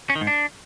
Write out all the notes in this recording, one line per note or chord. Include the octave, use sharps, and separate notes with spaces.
C#4
D#3
G#2
D4